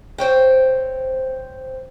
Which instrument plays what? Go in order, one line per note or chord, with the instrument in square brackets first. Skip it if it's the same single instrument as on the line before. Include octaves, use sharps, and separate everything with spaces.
[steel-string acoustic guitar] C4 C5 C#5 G5